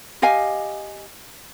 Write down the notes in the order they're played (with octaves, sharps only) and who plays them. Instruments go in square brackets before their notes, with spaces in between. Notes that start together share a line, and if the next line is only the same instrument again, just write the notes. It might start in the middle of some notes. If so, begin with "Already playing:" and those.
[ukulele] G4 D#5 F5 G#5